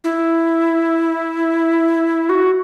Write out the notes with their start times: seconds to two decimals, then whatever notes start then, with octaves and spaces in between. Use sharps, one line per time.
0.04 E4
2.29 F#4